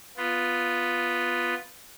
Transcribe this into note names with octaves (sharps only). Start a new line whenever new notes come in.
B3 F4